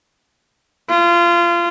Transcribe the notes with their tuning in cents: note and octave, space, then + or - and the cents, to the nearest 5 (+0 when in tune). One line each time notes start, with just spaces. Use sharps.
F4 -25